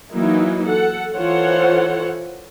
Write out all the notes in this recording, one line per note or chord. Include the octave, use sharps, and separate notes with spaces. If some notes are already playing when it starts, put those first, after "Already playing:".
E3 F#3 A#3 D#4 E4
A4 F#5
E3 F4 A4 C5 C#5 F#5